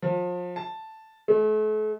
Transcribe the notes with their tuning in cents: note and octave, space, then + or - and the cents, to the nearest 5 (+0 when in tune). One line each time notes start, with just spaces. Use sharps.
F3 +35
A5 +0
A3 -40